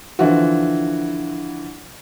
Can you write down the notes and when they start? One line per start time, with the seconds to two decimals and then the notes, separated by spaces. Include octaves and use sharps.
0.19 D3 E3 F3 F4 F#4